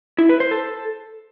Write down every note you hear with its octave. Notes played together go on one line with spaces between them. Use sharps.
E4
B4
C5
A4